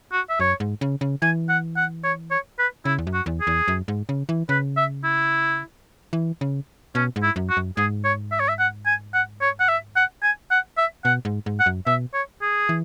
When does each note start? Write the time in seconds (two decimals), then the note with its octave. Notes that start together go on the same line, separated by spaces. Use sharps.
0.12 F#4
0.29 E5
0.40 F#2 C#5
0.60 G#2
0.81 C#3
1.01 C#3
1.22 E3 G#5
1.49 F#5
1.77 F#5
2.04 C#5
2.31 C#5
2.59 B4
2.85 C#3 E4
2.98 E2
3.07 F#2
3.13 F#4
3.26 E2
3.41 G#4
3.47 E2
3.68 F#2
3.88 G#2
4.09 C#3
4.29 E3
4.49 C#3 B4
4.77 E5
5.04 E4
6.13 E3
6.41 C#3
6.95 B2 C#4
7.16 G#2
7.23 E4
7.36 F#2
7.50 F#4
7.57 F#2
7.77 G#2 G#4
8.04 C#5
8.32 E5
8.40 C#5
8.49 E5
8.59 F#5
8.86 G#5
9.14 F#5
9.41 C#5
9.60 F#5
9.69 E5
9.96 F#5
10.23 G#5
10.51 F#5
10.77 E5
11.05 B2 F#5
11.25 G#2
11.46 G#2
11.60 F#5
11.66 F#2
11.87 B2 E5
12.14 C#5
12.42 G#4
12.69 E3